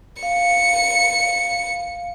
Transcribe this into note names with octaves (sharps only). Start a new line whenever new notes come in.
F5 C#7